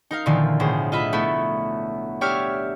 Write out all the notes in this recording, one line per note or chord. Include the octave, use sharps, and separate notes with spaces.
D#4 A#4 F5
A#2 D3 D#3 F3 E4 F4
B1 A2 G#4 C5
F4 D#5 E5 B5
A3 B3 E4 A4
D4 G4 C#5 E5 F6 D7